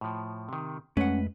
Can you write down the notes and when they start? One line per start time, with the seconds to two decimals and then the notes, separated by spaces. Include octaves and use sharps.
0.01 A2 F3
0.49 C3 D#3
0.97 F2 G#3 A3 C#4 B4 F#5